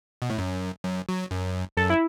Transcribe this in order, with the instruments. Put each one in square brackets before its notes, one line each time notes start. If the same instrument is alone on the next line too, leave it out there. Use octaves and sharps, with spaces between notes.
[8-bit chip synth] B2
A2
F#2
F#2
F#3
F#2
[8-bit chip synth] F#2 [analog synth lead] A4
[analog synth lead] E4